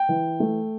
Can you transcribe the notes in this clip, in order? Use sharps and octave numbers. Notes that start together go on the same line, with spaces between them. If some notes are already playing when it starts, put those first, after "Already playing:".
Already playing: G5
E3
A3